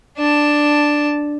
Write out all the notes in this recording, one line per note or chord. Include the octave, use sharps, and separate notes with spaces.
D4 A5